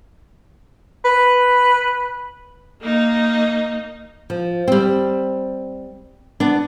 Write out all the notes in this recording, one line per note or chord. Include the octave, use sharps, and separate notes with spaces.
B4
A#3 D#4
F3
G3 C4
B3 D4